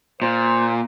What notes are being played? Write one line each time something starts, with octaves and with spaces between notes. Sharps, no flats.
A#2 C5